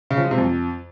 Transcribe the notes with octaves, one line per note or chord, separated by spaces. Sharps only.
C#3
F3
G#3
C3
F2